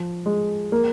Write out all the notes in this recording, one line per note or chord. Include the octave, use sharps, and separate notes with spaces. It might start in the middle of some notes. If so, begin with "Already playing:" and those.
Already playing: F3
G#3
A#3